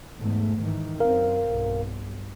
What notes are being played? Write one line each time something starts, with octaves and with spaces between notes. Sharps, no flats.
E2 G#2 A3
G#2 D#3 E3
F#2 C4 A#4 F5
B1 G2